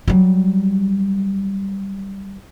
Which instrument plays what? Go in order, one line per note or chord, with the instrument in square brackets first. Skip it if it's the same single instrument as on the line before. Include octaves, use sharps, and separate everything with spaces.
[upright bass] F#3 G3